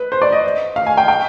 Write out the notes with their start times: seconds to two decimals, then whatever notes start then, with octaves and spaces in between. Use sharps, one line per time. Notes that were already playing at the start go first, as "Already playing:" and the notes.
Already playing: B4
0.12 C5
0.22 D5
0.32 D#5
0.76 F5
0.87 G#5
0.97 G5
1.08 G5